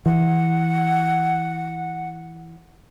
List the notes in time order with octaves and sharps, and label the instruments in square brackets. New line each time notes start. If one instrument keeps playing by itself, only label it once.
[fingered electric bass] E3 [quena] F#5